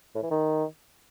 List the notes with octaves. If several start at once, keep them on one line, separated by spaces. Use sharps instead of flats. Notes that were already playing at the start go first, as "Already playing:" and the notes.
A2
E3
D#3